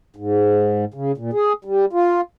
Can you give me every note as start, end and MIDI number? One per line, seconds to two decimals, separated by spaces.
0.16 0.85 44
0.94 1.12 49
1.18 1.31 46
1.33 1.53 68
1.65 1.85 55
1.93 2.21 65